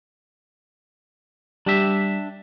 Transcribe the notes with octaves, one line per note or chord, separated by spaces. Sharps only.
G3 D4 G4 E5